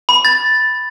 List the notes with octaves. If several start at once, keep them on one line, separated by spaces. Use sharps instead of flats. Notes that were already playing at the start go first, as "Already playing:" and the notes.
B5
A6